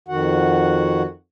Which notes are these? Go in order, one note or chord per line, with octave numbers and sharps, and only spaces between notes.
F2 D#3 F#4 F#5